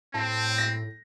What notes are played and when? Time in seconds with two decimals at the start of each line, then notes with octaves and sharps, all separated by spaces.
0.14 A2 C4 A5
0.58 A#6